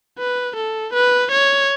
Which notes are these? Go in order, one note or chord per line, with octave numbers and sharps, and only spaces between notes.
B4
A4
B4
C#5